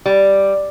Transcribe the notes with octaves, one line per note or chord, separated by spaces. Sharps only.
G3